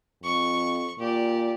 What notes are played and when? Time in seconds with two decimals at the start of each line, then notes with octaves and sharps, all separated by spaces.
0.24 F2 C#6
1.00 A#2 G4 D5